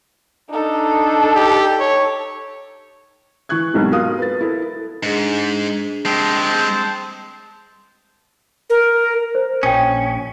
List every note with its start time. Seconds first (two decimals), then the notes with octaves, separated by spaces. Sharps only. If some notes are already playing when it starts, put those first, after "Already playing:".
0.50 D4 D#4 A4
1.35 G4
1.80 C#5
3.49 E3 C#6 F#6 G#6
3.73 B1 G#2 C3 G3
3.92 F4 F#4 A#4 F5 D#6
4.19 B4 A6
4.41 E4 A4 A#4
5.03 G#2 D4 G#4
6.05 G#3 C4 G4 C5 A5
8.70 A#4
9.35 C5
9.63 A#1 C#4 G5 D#6